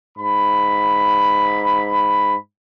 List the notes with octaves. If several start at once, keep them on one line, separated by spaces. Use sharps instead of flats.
G#2 B5